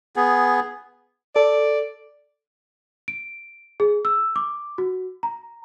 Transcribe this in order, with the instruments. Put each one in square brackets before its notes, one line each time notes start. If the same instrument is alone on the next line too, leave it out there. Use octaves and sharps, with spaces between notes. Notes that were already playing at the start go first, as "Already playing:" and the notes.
[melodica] B3 G#4
[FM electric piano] A4 [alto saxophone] D5
[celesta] D7
G#4
E6
D6
F#4
A#5